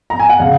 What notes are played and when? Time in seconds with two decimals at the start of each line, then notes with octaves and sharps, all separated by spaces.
0.10 A#5
0.19 G#5
0.30 F#5
0.40 C#3 F5